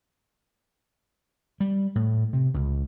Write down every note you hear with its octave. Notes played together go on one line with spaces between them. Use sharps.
G3
A2
C3
C#2